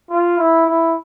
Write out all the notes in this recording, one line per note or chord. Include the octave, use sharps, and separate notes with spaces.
F4
E4
E4